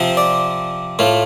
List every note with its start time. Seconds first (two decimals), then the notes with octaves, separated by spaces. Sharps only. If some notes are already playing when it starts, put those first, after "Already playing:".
Already playing: C3 F3 C4
0.17 D5
0.99 A2 A3 F4